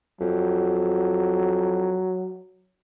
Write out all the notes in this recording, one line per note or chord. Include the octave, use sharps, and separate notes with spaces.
F2 F#3